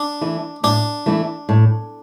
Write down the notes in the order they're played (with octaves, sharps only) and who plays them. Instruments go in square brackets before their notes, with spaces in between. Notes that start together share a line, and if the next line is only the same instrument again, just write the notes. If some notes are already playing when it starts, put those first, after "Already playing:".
Already playing: [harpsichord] D4
[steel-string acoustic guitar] E3 A3 E4
[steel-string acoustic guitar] A2 [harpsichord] D4
[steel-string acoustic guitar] E3 A3 E4
A2